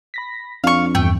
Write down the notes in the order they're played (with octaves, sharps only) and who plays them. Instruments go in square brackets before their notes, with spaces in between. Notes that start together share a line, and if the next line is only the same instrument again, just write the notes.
[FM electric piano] B5 A#6 B6
[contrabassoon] F2 [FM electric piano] D4 [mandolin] F5 C#6
[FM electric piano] E2 G2 [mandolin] A3 G5